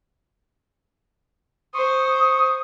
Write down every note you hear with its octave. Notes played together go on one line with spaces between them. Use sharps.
C5 C#6 D#6